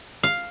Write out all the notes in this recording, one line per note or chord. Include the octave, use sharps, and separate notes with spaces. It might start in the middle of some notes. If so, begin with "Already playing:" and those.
F5